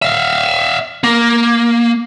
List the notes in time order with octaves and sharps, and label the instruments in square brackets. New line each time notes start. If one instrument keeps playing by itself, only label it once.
[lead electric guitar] E5 F5
A#3